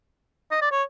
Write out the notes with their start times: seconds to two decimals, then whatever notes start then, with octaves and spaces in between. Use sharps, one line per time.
0.51 D#5
0.62 D5
0.71 C#5